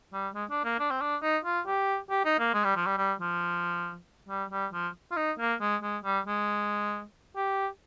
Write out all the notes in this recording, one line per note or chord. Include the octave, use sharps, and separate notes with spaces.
G3
G#3
D4
A#3
D4
C4
D4
D#4
F4
G4
G4
D#4
A#3
G#3
G3
F3
G3
G3
F3
G3
G3
F3
F4
D#4
A#3
G#3
G#3
G3
G#3
G4